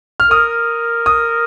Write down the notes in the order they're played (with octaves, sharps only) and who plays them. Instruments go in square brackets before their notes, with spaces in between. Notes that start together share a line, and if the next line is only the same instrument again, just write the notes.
[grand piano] F6
[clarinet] A#4 [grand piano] D#6
[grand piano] D#6